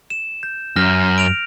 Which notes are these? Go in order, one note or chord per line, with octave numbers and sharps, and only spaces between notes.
E7
G6
F#2 F6 A#6
D7 F7